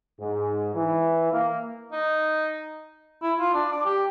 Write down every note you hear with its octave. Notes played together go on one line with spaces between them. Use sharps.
G#2
E3
A#3
D#4
E4
F4
D4
D5
G4